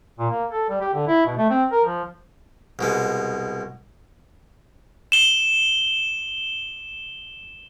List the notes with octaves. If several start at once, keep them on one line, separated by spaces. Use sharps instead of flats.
A#2
A#3
A4
G3
G4
D3
E4
B2
A3
C4
A#4
F3
C2 B2 G#3
E7 G7